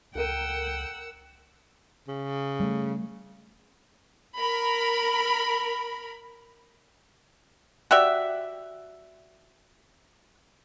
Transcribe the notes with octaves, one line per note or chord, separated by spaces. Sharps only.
C#2 A4 A#4 F#5 G5 E6 D#7
C#3
G3 A3
A#4 B5
F#4 G4 D5 E5